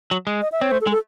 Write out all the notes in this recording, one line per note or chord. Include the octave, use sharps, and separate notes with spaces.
F#3
G#3
D#5
E5
C4 C#5
A3 C5
A4
G#3
A4